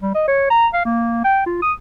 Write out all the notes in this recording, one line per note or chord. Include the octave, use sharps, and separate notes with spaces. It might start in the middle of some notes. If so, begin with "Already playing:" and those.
G3
D#5
C#5
A#5
F5
A#3
G5
F4
D#6